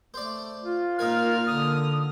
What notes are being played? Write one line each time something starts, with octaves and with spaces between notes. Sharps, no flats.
A3 C5 D5
F4
A#2 D#4 A#4 G#5 F6
D3 D#6